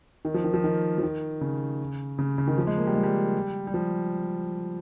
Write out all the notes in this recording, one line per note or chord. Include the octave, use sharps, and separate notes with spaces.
D#3
F3
D#3
F3
D#3
F3
D#3
C#3
C#3
C#3
D#3
F3
G#3
A#3
G3
G#3
G3
G3
F3